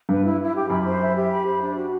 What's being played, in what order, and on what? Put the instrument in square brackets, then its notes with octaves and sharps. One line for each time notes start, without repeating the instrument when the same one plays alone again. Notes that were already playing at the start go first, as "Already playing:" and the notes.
[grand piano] G2 [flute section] B4
[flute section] E4
E4
G4
[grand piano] F#2 [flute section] B5
[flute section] C5
E5
G4
B5
C5
D4
F#4